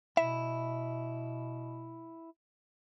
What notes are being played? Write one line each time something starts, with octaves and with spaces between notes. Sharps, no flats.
B2 E4 E5